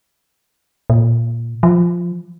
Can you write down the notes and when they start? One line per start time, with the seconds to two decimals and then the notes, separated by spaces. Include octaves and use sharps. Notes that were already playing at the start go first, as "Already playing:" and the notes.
0.90 A#2
1.63 F3